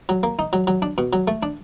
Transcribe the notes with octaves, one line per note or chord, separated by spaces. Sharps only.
F#3
A#3
D#4
F#3
F#3
D4
B2
F#3
A3
D4